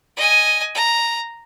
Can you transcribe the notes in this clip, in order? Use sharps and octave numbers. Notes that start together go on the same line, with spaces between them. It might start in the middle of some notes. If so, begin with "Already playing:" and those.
D#5 G#5
A#5